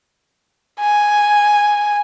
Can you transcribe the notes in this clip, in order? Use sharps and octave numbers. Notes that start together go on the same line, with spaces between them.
G#5